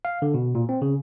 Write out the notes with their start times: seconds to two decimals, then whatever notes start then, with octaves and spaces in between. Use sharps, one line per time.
0.05 F5
0.22 D3
0.34 B2
0.55 A#2
0.69 C4
0.82 C#3